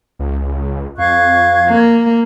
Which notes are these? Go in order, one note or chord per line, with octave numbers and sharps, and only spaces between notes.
C#2
F2 F5 C#6 F#6 G#6
A#3